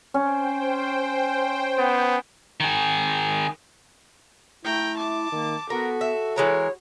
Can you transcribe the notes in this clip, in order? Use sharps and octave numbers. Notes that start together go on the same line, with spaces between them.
C#4 C5 G5
B3
D#3 G#4
A3 E4 G5 A#5
A5 D6
D#3 A#3
B3 F#4 A4 A#4
E5
E3 G#3 A#4 C#5